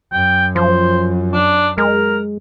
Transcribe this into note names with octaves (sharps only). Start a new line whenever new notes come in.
F#2 G5
F3 C5
D4
G#3 A#4